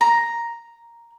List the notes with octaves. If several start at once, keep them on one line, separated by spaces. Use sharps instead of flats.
A#5